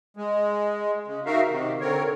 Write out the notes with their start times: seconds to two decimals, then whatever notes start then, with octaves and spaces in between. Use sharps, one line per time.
0.17 G#3
1.08 C#3 G#3
1.26 D#4 F#4 A#4 E5 F5
1.50 C3 D#3
1.81 D3 C4 A#4 C#5